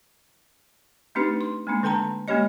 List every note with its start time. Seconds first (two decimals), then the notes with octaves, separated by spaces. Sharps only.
1.15 A3 C4 D4 D#4 G4 B4
1.41 C6
1.67 G#3 A#3 C4 D4
1.83 D3 A4 G5 A5 A#5
2.28 G#3 A#3 C#4 G4 C#5 D#5